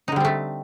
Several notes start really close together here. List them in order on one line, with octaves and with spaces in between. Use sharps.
D#4 D3 G3 C4 A3